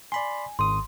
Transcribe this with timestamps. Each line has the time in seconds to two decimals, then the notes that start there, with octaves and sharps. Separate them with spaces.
0.12 D5 G#5 B5 C6
0.59 G#1 C6 D#6